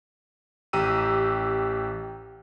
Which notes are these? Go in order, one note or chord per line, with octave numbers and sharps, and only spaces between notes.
A1 G4 A#5 E6 D#7